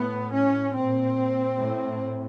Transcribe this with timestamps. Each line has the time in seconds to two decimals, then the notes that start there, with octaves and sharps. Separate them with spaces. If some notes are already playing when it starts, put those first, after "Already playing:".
Already playing: A2 B3
0.33 C#4
0.74 A#2 C4
1.57 A2